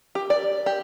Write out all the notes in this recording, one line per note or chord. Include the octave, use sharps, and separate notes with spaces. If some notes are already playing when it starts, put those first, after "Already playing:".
G4
D5
G4